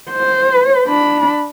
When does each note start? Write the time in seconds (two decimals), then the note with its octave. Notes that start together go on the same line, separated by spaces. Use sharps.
0.10 C5
0.87 D4 B5